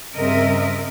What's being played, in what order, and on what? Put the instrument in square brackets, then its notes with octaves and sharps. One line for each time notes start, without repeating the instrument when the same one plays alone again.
[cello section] G2 C#3 C4 A#4 D#5 E5